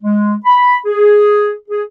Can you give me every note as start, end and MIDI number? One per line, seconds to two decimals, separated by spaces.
0.03 0.34 56
0.45 0.77 83
0.85 1.54 68
1.69 1.83 68